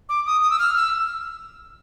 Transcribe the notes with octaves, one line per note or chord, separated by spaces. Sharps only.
D6
D#6
D#6
E6
F6
E6